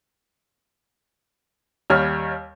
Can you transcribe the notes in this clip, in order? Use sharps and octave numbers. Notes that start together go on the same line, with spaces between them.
D#2 G3 C#5 F6